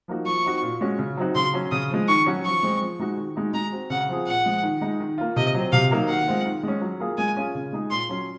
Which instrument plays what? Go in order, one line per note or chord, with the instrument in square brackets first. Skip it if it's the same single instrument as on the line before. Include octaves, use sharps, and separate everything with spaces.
[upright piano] F3 A#3 D#4 F#4
[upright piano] F3 [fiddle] C#6
[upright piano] C4 D#4 F#4
A#2
G#3 C#4 F#4
C#3
F#3 C4 D#4 F#4
[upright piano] C#3 [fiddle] C6
[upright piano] F#3 C#4
[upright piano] C#3 [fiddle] D#6
[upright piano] F3 G#3
[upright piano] D#3 [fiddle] C#6
[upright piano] F#3 C#4 F#4
[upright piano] F3 [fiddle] C#6
[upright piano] G#3 C4
F3
G#3 D#4 F#4
D#3
G#3 D#4 F#4
[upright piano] G#3 [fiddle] A#5
[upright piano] C4 F#4
[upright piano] C#3 [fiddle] F#5
[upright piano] F3 C4 F4 G#4
[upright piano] A#2 [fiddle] F#5
[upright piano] F3 G#3
D#3
G#3 D#4
D#3
A#3 F4
[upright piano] C3 [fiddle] D#5
[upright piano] F#3 C4
[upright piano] C3 [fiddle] F5
[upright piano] F#3 A#3 D#4
[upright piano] D#3 [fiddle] F#5
[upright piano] G#3 C4 F4
D#3
G#3 C#4
F#3
A#3 F4 G#4
[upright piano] G#3 [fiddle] G#5
[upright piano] C#4 F4 G#4
C#3
G#3 D#4 G#4
[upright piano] A#2 [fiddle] C6
[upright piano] F#3 C#4